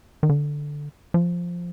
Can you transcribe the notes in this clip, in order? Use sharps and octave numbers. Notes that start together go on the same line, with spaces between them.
D#3
D3
F3